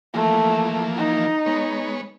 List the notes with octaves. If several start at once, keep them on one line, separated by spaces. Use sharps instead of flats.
E3 F3 A3 A#3
D#4
G#3 B3 C#5